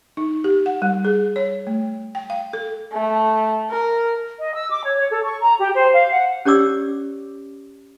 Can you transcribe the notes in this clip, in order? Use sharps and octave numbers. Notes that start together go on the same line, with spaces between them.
D#4
G4
F#5
G3
G#4
C#5
A3
G5
F5
A4
A3
A#4
D#5
E6
D6
C#5
C#5
A4
C#6
A#5
G4
C5
F5
F#5
C#4 G4 C#5 D5 D6 E6